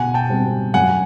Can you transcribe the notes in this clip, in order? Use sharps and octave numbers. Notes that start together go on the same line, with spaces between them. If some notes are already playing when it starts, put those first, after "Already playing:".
Already playing: B2 F#5 G#5
G5 A5
G3 C4
F#2 F#5 G#5